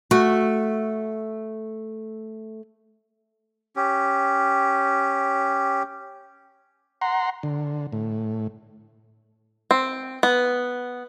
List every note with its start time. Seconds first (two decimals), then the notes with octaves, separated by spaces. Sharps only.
0.11 A3 F#4
3.76 C#4 G4
7.01 F#5 A#5 C6
7.43 D3
7.92 A2
9.71 C4
10.23 B3